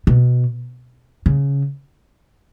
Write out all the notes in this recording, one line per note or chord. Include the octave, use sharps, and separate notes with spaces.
B2
C#3